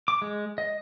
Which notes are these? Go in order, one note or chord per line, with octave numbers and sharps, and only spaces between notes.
D6
G#3
D#5